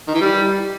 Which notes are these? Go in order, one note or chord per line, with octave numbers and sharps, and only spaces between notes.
D#3
E3
G3